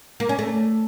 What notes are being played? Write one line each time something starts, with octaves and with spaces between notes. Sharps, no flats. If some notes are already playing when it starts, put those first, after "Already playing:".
A#3
C#4
A3